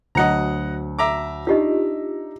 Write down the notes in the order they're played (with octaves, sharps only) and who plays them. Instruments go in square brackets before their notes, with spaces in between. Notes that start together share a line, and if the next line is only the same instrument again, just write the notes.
[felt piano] D2 F#3 [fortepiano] D#5 F#5 A#5
[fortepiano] E5 A#5 D6
[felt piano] D4 D#4 [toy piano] F4 G4 D#5